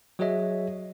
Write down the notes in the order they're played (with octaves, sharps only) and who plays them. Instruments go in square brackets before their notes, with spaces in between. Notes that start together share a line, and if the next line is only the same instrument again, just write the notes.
[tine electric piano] F#3 F#4 G#4 C#5 D#5 E5